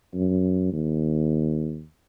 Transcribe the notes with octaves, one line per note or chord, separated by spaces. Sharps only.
F#2
D#2